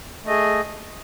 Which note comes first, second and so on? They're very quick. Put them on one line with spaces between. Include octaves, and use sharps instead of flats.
A3 D#5 G#4